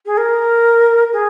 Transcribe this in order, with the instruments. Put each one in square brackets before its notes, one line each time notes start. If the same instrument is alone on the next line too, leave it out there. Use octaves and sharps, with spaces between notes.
[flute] G#4
A#4
G#4